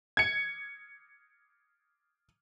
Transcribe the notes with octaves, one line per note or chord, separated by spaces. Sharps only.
G#6 C#7